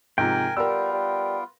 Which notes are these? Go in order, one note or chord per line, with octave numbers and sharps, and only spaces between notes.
G#2 C3 F3 A#4 G5 G#5
G3 B3 F4 A#4 E6
G3